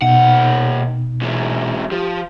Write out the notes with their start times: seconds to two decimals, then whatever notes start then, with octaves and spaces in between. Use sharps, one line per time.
0.02 D#2 B2 D#4 F#5
1.21 G#2 E3
1.92 F3 G4